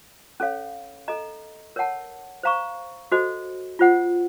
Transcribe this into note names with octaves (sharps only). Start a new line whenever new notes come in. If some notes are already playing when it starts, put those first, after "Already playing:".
C#4 A4 C#5 F5
A4 D#5 A#5
A#4 C#5 F#5 A5
C5 F5 A#5 C#6
F#4 A4 C5 D#5
F4 C5 F#5